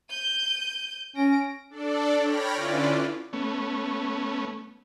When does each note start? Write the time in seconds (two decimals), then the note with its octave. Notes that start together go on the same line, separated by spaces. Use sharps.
0.10 G6 D#7
1.16 C#4 A#6 D7
1.70 D4 A4 D5
2.20 C#5 G5 B5 F6 A#6
2.52 D3 C#4 E4 F4 B4 D5
3.33 A3 B3 C#4